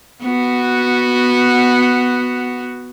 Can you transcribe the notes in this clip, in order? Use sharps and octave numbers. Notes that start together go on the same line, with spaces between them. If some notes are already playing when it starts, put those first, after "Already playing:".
B3 F#4